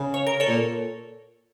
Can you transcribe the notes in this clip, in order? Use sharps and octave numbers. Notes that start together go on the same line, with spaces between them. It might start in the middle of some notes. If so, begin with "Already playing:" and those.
Already playing: C#3
C#5
A#4
A4 C#5
A#2